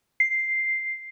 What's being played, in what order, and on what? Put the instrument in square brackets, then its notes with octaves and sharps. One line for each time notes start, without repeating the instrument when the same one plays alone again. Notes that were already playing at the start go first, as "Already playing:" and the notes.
[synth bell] C7